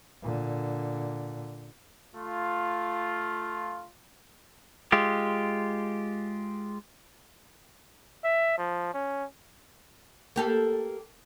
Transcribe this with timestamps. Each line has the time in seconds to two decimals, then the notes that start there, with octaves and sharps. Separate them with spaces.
0.22 A#2 D3
2.15 A3 F4
4.92 G#3 F4 G4
8.24 E5
8.58 F3
8.94 C#4
10.36 A#3 G4 A4